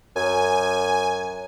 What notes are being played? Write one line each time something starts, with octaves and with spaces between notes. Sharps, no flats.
F#2 G#5